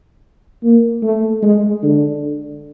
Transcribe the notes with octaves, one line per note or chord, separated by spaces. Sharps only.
A#3
A3
G#3
D3